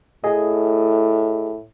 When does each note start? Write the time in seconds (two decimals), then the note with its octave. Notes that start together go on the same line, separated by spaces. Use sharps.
0.24 A2 G#4 D#5